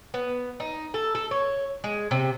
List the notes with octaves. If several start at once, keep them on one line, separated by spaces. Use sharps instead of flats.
B3
D#4
A4
A4
C#5
G#3
C3